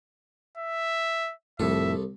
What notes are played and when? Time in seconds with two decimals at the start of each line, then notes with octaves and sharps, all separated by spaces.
0.58 E5
1.60 C2 F2 A2 A4 E5